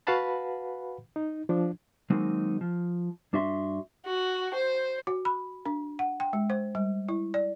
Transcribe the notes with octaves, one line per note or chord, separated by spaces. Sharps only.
F#4 B4 F5 F#5 A5 B5
D#4
F3 D4
D#3 F#3 G#3 A#3 C4 D#4
F3
G2 D4 F#4 E5 C6
F#4
C5
F#4
B5
D4
F#5
G5
G#3
C5
G3
E4
D5